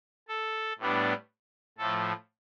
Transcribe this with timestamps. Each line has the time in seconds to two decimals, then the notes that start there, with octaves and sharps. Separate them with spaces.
0.28 A4
0.78 A2 G3 B3 D4
1.78 A2 F3 A3 A4